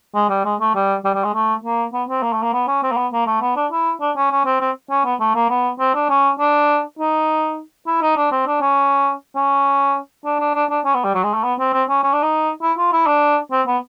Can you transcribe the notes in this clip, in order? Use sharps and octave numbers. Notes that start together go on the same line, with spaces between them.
G#3
G3
G#3
A3
G3
G3
G3
G#3
A3
A#3
B3
C4
A#3
A3
A#3
B3
C#4
C4
A#3
B3
A#3
A3
B3
D4
E4
D4
C#4
C#4
C4
C4
C#4
B3
A3
A#3
B3
C4
D4
C#4
D4
D#4
E4
D#4
D4
C4
D4
C#4
C#4
D4
D4
D4
D4
C#4
B3
G3
F#3
G#3
A3
B3
C4
C4
C#4
C#4
D4
D#4
E4
F4
E4
D4
C4
B3